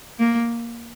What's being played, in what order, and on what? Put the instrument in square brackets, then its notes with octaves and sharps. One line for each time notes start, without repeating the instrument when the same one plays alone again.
[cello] A#3